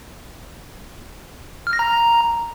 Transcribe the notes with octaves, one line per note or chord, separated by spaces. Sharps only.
F6
A#6
A#5